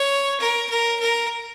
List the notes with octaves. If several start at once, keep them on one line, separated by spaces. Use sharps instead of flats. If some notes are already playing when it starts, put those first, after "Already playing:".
Already playing: C#5
A#4
A#4
A#4